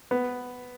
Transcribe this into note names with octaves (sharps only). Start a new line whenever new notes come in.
B3